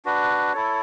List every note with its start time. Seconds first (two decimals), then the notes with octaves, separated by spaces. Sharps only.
0.05 D4 F#4 B4
0.53 E4 A4 C#5